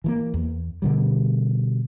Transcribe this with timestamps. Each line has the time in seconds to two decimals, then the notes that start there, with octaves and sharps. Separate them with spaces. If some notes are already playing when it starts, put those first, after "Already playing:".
0.04 E3 F3 A#3
0.34 E2
0.82 B2 D3 G3